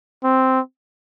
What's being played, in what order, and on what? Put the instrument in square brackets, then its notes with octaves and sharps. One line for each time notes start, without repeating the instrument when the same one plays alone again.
[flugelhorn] C4